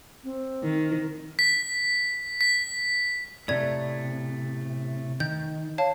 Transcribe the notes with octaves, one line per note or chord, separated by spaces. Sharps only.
C4
D#3
B6
B6
A2 C3 A3 D5 G#6
D#3 G6
C#5 F5 A5